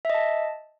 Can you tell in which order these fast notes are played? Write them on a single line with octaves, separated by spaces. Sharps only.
E5 D#5 A5